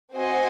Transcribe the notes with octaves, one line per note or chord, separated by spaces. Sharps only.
C4 F#4 C5 D#5 G#5